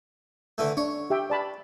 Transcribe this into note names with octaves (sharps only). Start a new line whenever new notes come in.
D3 E3 A3
D4 C#5
G4 E5 G5
D5 A5 B5